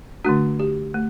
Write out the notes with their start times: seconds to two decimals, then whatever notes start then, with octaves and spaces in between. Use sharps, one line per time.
0.24 D3 A3 D4 F#4
0.60 G4
0.94 A3